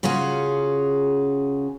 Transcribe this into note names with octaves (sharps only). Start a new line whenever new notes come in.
C#3 C#4 F4 F#4 G#4